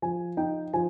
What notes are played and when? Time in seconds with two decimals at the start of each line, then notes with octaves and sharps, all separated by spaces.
0.02 F3 G#5
0.37 D#4 G5
0.73 F3 G#5